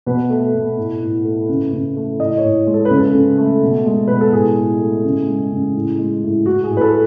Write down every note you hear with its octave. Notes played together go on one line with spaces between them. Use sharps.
B2 B4
A3
B2
A2
A2
A3
C#3
C#3
A3
A2 D#5
C#5
A2
G#3
A4
B4
C#3
A4
C#3
A3
B2
G#3
B2 B4
A4
A2 G#4
A2
A3
C#3
G#3
C#3
A2
G#3
A2
A2 F#4
G#4
A2
B4
A4